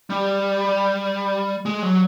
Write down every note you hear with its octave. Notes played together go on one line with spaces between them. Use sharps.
G3
G#3
F#3